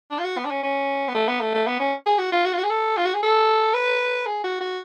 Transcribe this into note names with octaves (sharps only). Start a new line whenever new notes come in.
D4
F4
F#4
B3
D4
C#4
C#4
B3
A3
B3
A3
A3
B3
C#4
G#4
F#4
F4
F#4
F4
F#4
G#4
A4
F4
F#4
G#4
A4
B4
G#4
F#4
F#4